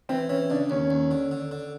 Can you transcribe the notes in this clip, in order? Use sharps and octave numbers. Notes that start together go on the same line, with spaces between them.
E3 C4
E3 C#4
C#3 D4
D#2 C#4
D#2
D3
D3
D3